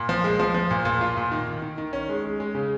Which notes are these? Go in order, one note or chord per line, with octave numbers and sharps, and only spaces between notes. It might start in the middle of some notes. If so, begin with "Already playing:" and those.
Already playing: A#2
F3
G#3
F3
F3
A#2
A#2
F4
A#2
D#3
D#3
D#3
D#3
C#4
G#3
G#3
G#3
C#3